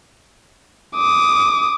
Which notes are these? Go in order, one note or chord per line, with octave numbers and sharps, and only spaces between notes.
D6 D#6